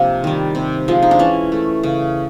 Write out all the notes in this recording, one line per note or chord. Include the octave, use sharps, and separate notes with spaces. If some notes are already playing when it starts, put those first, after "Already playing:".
Already playing: C3 F3 A#3 D4
D#3 G3
C3
F3 G#3
D#4
D4
E3 C#4
A3
C#3